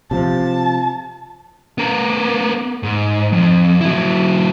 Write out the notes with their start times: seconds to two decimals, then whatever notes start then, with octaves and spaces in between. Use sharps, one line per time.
0.11 C3 F3 A5
1.78 B3 A#4
2.83 G#2
3.32 F2
3.81 F#3 E4